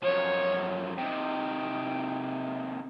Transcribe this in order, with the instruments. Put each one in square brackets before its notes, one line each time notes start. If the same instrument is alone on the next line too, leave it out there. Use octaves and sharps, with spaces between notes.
[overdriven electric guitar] F#2 F3 [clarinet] C#5
[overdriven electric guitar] C3 D#3 [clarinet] G5